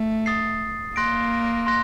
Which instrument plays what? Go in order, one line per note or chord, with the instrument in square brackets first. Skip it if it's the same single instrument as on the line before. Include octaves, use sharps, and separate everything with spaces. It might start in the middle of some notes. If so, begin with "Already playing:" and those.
Already playing: [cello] A3
[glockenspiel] D#6 A6 C7
[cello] A#3 [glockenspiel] C6 F#6 A#6 D7
[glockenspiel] C6 F#6 A#6